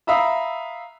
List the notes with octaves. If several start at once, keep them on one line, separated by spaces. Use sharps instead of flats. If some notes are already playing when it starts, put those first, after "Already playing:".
E5 F5 A#5 B5 D#6 E6